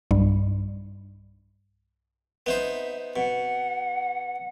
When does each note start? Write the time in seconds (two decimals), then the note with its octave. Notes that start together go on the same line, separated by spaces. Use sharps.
0.11 B1 G2 G3
2.46 B3 D#4 C5 E5
3.16 B2 F#5